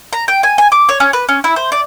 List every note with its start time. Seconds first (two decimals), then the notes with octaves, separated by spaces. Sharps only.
0.13 A#5
0.28 G5
0.43 G#5
0.58 G#5
0.72 D6
0.89 C#5
1.00 C#4
1.13 B4
1.29 C#4
1.44 E4
1.56 C5
1.72 D5